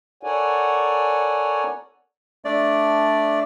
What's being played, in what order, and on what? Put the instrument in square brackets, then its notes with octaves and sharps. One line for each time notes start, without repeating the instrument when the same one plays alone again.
[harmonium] A4 A#4 C#5 D5 F#5 G#5
[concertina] A3 D4 D5